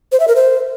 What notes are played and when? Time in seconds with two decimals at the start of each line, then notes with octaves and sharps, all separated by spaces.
0.12 C5
0.20 E5
0.28 A#4
0.36 C5